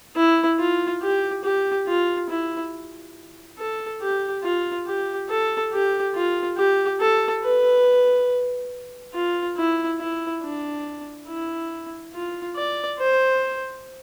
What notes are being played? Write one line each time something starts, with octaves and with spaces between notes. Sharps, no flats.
E4
F4
G4
G4
F4
E4
A4
G4
F4
G4
A4
G4
F4
G4
A4
B4
F4
E4
E4
D4
E4
F4
D5
C5